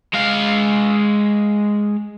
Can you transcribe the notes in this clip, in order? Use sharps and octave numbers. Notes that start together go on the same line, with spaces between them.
G#3 F5